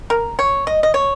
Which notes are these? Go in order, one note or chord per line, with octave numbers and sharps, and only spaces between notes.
A#4
C#5
D#5
D#5
C#5